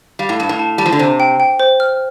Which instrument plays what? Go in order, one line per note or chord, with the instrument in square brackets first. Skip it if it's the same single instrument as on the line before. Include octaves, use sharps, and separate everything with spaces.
[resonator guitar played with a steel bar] G3 [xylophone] F5
[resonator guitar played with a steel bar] A2
[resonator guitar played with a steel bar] G2 [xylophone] A5
[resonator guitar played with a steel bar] A2
[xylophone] A5
[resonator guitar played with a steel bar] G3 [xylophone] A5
[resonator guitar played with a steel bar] F3
D3
[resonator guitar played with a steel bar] C3 [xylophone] C5
[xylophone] G5
G5
C5
F6